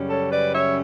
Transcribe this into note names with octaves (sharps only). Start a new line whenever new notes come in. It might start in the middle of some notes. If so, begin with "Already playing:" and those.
Already playing: F#2 C#3 G3 C#4
A4 C#5
B4 D5
C#5 E5